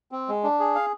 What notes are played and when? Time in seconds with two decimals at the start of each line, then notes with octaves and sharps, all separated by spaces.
0.12 C4
0.28 G#3
0.44 D4
0.60 G#4
0.75 F5